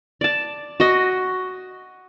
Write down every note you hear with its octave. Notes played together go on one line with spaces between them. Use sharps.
D5 A5
F#4 D#5